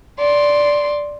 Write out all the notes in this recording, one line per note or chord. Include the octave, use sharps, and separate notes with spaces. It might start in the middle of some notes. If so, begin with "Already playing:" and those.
D5 C6